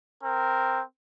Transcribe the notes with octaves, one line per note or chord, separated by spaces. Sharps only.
C4 A#4